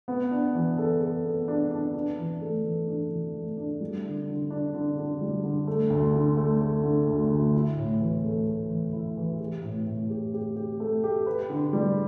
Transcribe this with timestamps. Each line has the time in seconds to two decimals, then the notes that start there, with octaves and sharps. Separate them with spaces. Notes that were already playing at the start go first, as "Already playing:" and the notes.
0.08 B3
0.31 D4
0.55 E3
0.78 A4
1.01 A4
1.24 B3
1.48 D4
1.71 D4
1.94 D4
2.18 E3
2.41 A3
2.65 E3
2.88 D4
3.11 E3
3.34 A3
3.57 D4
3.80 G3
4.04 D3
4.28 D3
4.50 D4
4.74 D3
4.97 D3
5.21 G3
5.44 D3
5.67 A3
5.90 D2
6.14 D3
6.37 A3
6.61 A3
6.84 D3
7.07 D2
7.30 D2
7.54 E4
7.77 A2
8.00 E3
8.23 A3
8.46 A3
8.70 E3
8.93 E4
9.17 E3
9.40 G4
9.63 A2
9.87 A2
10.10 G4
10.34 G4
10.56 G4
10.80 A3
11.04 G4
11.26 B4
11.50 D3
11.73 G3